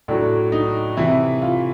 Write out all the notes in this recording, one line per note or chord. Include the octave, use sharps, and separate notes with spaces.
A2 F#3 D4
D#4
C3 E3 E4
F4